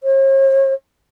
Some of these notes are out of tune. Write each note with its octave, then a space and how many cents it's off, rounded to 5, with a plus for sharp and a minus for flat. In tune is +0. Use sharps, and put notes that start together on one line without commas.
C#5 -45